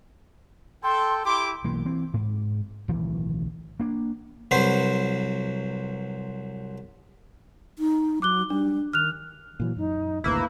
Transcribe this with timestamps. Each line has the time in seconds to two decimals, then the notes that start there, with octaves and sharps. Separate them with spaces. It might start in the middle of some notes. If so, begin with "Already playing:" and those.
0.84 A4 G5 C6
1.25 E4 G4 C6 D6
1.64 B1 E3 A#3
1.85 E3 C4
2.14 G#2
2.88 D1 B1 D#3 E3
3.80 A#3 D4
4.51 C2 F#3 F#4 B4 C5 C6
7.79 D#4
8.22 F#3 D6 F#6 G7
8.50 G3 D4
8.93 D#3 F6 F#6 F7
9.60 A#2 E3 F#3
9.77 F#2 D#4
10.24 G#1 D2 C3 A#3 E4 B4